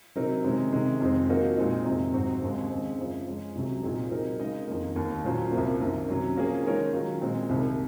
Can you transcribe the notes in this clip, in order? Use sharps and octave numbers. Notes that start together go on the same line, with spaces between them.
C3 F#3 C4 D#4 A#4
C3 D#3 G#3 C#4
C3 D#3 G#3
F2 D#3 G#3 C4
F3 A#3 D#4 F#4 A#4
A#2 G#3 C4 D#4
F2 C3 D#3
G#2 F#3 C4 F#4
D#2 C#3 G#3 C4
C#3 G#3 C4
F#2 C#3 F3
F3 G#3 C#4
C2 C3 F#3
A#2 F3 C4 D#4 G#4
F#3 C4 D#4 A#4
C#3 G#3 D#4 A#4 D#5
F2 D#3 A#3
D#2 D#3 A#3
A#2 F#3 C#4 F4 C5
C2 C3 F3 A#3
F#2 D#3 A#3
C3 F#3 C#4
F3 A#3 C#4 G#4
D#3 G#3 D#4 A#4 C#5
D#3 F#3 C#4 F4
A#2 G#3 C4
C2 C3 D#3